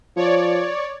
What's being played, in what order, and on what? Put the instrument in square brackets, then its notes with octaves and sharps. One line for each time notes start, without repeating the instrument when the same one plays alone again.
[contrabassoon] F3 [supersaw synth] C#5 D5